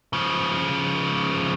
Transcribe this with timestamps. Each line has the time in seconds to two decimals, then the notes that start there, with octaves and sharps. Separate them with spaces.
0.13 C#3 F3